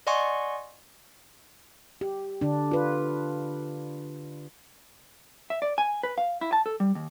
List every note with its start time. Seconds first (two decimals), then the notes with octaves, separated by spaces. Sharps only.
0.07 D5 D#5 F#5 G#5 C6 C#6
2.01 G4
2.41 D3 D4
2.71 F4 B4
5.50 E5
5.62 D5
5.78 G#5
6.03 B4
6.18 F5
6.41 E4
6.53 A5
6.66 A4
6.80 G3
6.95 D#2